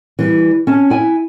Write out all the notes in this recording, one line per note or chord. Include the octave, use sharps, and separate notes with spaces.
E3 G3
C#4 A5
E4 G#5